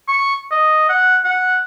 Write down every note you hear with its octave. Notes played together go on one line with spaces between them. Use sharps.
C#6
D#5
F#5
F#5